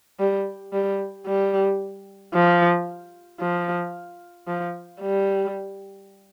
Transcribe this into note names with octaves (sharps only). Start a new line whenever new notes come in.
G3
G3
G3
F3
F3
F3
G3